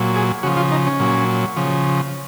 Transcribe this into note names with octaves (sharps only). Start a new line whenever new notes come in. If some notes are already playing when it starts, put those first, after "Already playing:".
Already playing: A#2 F#3
G#4
C#3 F3 F#4
F4
D#4
C#4
A#2 F#3
C#3 F3